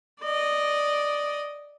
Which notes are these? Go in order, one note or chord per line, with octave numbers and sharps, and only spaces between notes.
D5 D#5